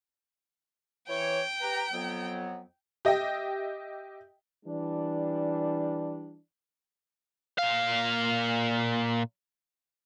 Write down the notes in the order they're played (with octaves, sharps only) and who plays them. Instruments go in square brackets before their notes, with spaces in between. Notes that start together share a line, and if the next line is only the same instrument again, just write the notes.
[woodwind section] E3 C#5 [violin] G5
[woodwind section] G4 B4 A#5
F2 F#3 B3
[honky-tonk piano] G4 D#5 E5 G5
[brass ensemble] E3 G3 D4
[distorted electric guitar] A#2 F5